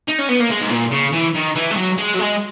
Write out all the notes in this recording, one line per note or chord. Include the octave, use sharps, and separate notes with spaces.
D#4
C#4
B3
A#3
G#3
G#2
A#2
C#3
E3
D#3
E3
G#3
F#3
G#3
F#3
G#3